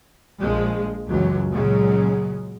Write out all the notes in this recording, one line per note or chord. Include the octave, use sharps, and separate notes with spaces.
A#1 F3 G#3
C#2 F#2 E3 F#3
A#2 C#3 F#3 G#3